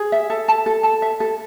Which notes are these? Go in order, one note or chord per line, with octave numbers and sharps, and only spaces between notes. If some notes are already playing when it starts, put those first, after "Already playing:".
Already playing: G#4
E5
A4
A5
A4
A5
E5
A4